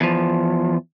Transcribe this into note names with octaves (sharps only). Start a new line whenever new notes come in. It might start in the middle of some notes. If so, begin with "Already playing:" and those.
E2 F3